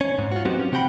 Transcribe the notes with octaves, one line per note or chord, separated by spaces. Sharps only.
C#4
G#2
F4 F#4
F#3 B3 C4 D#4 F#4 G4
C#4
C3 C4 F#5 G5 B5